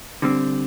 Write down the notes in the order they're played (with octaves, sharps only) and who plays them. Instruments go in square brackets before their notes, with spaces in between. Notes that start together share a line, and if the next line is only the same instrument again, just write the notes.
[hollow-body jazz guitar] D3 G3 C4